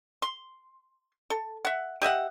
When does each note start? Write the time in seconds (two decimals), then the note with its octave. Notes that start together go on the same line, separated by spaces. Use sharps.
0.22 C6
1.30 A4
1.65 E5 F#5
2.02 G4 D#5 E5 F#5